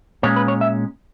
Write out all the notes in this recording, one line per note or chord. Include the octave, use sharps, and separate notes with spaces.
A#2 G#3 C#4 C#5
B4
C#5
E5